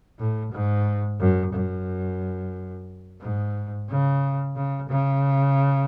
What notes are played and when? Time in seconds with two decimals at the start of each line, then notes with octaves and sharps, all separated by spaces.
0.19 A2
0.52 G#2
1.20 F#2
1.54 F#2
3.21 G#2
3.89 C#3
4.56 C#3
4.89 C#3